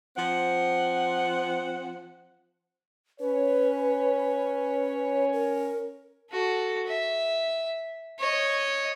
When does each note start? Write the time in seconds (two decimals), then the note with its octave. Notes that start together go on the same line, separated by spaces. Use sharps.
0.17 F3 C4 F#5
3.20 C#4 B4 C#5
5.33 A#4
6.30 F#4 A4
6.87 E5
8.19 C#5 D#5